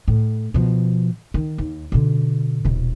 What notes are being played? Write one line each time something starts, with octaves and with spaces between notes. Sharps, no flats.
A2
B2 F3
D#3
D#2
B2 D3
D#1 B2